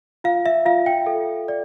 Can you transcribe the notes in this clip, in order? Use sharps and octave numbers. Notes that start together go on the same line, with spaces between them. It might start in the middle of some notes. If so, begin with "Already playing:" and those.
F4 F5
E5
F4 F5
G5
A4
D5